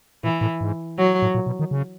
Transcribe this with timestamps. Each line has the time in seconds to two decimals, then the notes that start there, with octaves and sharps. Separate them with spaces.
0.23 A#2 E3
0.41 A2
0.61 G#2
0.98 F#3
1.22 A2
1.35 A#2
1.47 B2
1.60 D#3
1.71 C#3